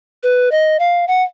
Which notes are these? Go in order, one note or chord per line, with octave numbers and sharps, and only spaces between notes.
B4
D#5
F5
F#5